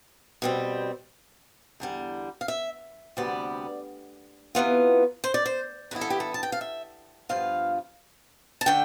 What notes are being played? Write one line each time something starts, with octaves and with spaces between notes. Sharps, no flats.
B2 G3 C4
E2 D3 G3
F5
E5
D2 C3 G3 B3 D5
C3 E3 B3 F4
C5
D5
C5
G2 E3 B3 E4 B4
A4
G4
A4
A5
G5
F5
E5
G2 F3 B3 F4 F5
A5
D3 A3 G5